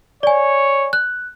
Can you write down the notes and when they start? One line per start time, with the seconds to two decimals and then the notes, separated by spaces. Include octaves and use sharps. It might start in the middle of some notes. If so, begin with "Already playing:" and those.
0.23 C#5 D5 G#5
0.93 F#6